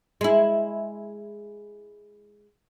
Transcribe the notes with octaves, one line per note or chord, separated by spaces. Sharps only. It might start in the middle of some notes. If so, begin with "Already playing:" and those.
G#3 E4